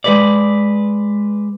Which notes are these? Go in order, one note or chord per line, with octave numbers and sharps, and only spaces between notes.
G#3 B4 D5